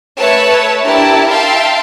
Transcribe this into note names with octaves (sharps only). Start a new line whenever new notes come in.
A3 B4 C#5 E5 A5
D4 E4 G4 A#4 A5
E5 F5 G5 A5 C6